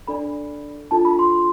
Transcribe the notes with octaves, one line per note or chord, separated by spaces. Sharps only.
D4 A4 D5 B5
D4 F4 A4 A5
B5
C6